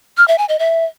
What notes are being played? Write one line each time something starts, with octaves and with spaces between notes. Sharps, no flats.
F6
E5
G#5
D#5
E5